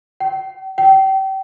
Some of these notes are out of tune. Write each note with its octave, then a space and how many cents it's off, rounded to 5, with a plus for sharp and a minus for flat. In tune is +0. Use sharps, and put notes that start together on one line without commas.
G5 -40
G5 -30